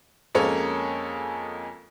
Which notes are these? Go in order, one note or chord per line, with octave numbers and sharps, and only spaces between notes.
F2 G#3 A#3 C#4 A4 C#5